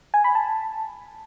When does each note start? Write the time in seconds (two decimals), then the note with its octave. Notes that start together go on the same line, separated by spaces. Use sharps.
0.14 G#5
0.24 B5
0.35 A5